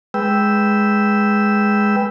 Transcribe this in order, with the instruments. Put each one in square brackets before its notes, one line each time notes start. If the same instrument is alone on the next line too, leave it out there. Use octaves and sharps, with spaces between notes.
[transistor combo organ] G#3 B4 G5 E6